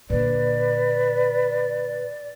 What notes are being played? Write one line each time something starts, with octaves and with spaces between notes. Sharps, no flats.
A#2 D3 B4 D5